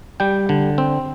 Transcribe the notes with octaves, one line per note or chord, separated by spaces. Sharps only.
G3 G5
D3
C4